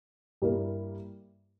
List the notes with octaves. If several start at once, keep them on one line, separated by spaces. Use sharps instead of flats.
G2 G3 A#3 E4 A#4